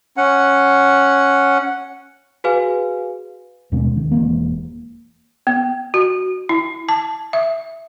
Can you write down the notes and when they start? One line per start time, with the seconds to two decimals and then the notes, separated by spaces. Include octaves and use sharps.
0.17 C#4 F#5
2.44 F#4 G#4 B4 F5 G#5
3.72 D#2 B2 G#3 C#4
3.97 D#3
4.11 E1 E3 G#3 A#3
5.47 B3
5.94 F#4
6.49 E4
6.89 A5
7.33 E5